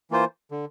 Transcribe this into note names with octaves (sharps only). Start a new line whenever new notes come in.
E3 A#3 F4 C5
D3